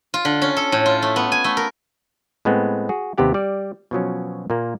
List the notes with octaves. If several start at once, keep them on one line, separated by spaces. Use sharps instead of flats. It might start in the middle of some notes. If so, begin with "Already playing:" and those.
F4
D3
C#4
A4
A2
F4
A3
B3
G#5
A3
A#4
A2 G#3 B3 C4
F#4 G#4
D#2 C3 B3 G4 F#5
G3 D5
B2 F3 F#3 C#4
A#2 A#3